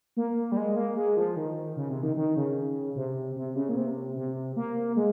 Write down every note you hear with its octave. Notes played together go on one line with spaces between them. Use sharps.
A#3
G3
G#3
A#3
G#3
F3
D#3
C#3
C3
D#3
D#3
C#3
C3
C3
C#3
A#2
C3
C3
A#3
G#3